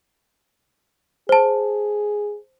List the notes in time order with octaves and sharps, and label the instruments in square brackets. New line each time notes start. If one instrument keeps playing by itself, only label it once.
[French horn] G#4 [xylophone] C5 A5